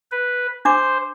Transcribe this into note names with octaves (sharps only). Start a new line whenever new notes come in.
B4
D4 C5 D6